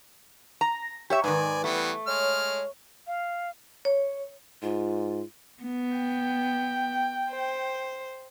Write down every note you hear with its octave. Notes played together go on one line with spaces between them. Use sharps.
A#5 A#6
G4 C#5 E5 C#6
G#2 D#3 B4 D5 G#5
E3 G3 A3 B3
G#3 C#5 F6
F5
C#5
G#2 F4
B3
G5
C5